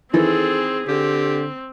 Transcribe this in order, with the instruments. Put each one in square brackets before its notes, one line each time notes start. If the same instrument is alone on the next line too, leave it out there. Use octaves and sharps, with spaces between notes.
[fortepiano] D#3 E3 [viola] C4 G#4 [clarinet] A4
[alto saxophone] D3 [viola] C4 [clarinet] G4